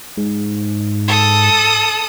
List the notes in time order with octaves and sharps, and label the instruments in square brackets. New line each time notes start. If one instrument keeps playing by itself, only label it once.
[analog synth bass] G#2
[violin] A4 D#6